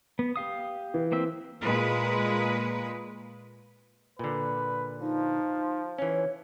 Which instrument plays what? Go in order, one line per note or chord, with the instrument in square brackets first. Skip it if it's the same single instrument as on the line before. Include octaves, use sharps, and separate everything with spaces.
[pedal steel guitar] B3
G4 F5 D#6
[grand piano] E3
[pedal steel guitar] A#3 C4 E5
[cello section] A#2 G#3 B4
[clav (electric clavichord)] A#2 D3 [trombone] B4
[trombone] F3 [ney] D#4
[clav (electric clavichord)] E3 C#4 [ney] C#5